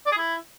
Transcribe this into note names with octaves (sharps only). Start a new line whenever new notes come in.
D5
G#4
E4